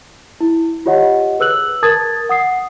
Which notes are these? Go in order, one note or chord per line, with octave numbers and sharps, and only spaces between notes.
E4
F4 G4 C#5 D#5 F#5
G#4 B4 E6 F#6 F#7
A#4 A5 D#6 G#6 A6
F#5 D#6 C7